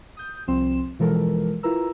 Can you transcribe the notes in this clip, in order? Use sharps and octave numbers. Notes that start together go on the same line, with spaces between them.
D#6 G6
C2 F3 C4 C6 E7
B2 E3 F3 G#3 A4 A#4
E4 F4 A#4 B4 A#5 E6